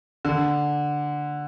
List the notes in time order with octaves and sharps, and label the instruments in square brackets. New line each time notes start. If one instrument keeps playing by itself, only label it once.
[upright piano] D3